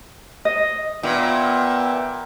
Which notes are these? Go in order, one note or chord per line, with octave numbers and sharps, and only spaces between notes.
D#5
A#2 B3 E5 G5